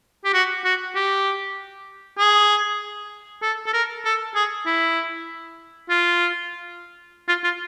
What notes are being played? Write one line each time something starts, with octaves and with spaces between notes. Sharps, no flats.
G4
F#4
F#4
G4
G#4
A4
A4
A#4
A4
G#4
E4
F4
F4
F4